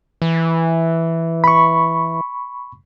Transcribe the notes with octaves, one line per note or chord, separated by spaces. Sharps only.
E3
B5 C#6